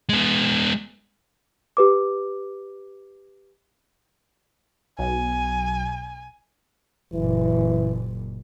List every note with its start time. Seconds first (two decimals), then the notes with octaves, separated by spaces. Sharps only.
0.09 G#3 B3
1.77 G4 B4 D6
4.99 B1 G#5
7.13 F#1 A#2 E3